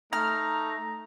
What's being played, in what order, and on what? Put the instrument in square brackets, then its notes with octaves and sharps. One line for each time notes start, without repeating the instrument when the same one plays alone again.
[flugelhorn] A3 [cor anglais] D#4 [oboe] A#5 [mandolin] F6